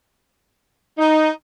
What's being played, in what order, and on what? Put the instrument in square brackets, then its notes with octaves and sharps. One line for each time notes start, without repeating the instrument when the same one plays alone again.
[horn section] D#4